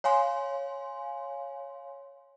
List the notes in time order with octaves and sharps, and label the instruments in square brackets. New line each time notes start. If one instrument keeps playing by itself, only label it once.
[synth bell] C#5 F5 G#5 C6